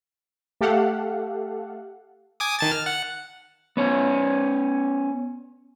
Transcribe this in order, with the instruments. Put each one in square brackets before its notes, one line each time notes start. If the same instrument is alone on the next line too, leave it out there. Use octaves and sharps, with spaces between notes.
[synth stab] A3 G4 A4 F5 F#5
[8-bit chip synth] G#5 D6 D#6
D#3 A5 A6
F6
F#5
[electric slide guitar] B3 C#4 C#5